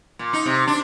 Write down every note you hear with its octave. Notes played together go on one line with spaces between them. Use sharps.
A#2
D#4
C3
D4